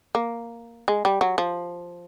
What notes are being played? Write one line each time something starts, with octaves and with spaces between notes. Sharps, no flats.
A#3
G#3
G3
F#3
F3